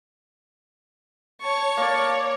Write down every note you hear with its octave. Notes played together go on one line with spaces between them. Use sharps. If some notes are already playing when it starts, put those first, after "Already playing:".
C#5 A5 C#6
A#3 D5